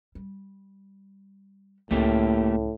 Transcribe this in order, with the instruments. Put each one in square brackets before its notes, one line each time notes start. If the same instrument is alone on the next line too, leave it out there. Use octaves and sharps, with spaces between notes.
[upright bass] G3
[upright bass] C#2 D#3 [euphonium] A2 [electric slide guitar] A3 A#3 G4